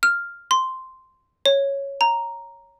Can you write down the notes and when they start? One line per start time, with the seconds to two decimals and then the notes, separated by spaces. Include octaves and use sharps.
0.03 F6
0.51 C6
1.46 C#5
2.01 A#5